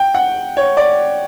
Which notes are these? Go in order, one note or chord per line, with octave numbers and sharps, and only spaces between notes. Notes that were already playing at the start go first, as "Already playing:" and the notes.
Already playing: G5
F#5
C#5
D5